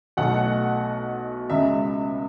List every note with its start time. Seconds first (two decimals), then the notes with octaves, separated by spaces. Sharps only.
0.17 B1 B2 A3 F#5
1.50 C#2 C#3 G#3 E5